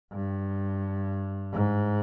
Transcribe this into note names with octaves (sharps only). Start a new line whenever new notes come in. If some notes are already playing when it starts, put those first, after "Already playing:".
G2
G#2